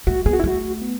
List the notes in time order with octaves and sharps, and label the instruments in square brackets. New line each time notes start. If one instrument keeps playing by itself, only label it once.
[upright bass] A3 [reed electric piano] F#4
[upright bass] B3 [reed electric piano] G#4
[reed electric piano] F#4
E4
[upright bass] A3 [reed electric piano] F#4
[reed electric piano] B3